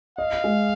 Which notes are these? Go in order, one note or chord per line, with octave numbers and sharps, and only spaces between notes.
D#5 F5
G#3